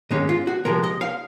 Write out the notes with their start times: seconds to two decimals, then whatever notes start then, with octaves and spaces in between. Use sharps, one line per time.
0.11 G#2 D#3 G#3 C#4 D#5
0.29 F4
0.47 F#4
0.65 C3 F3 G#3 A#4
0.83 D#5
1.01 F5